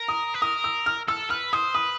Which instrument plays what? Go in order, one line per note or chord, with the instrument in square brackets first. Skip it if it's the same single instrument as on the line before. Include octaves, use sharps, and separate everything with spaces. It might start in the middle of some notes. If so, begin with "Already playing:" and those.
Already playing: [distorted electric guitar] A#4
[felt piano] D#6
[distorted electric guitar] B4
[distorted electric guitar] A#4 [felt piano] D#6
[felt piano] E6
F6
[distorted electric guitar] A4 [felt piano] E6
[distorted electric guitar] B4 [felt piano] F6
[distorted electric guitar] C5 [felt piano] D#6
[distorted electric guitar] B4 [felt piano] D#6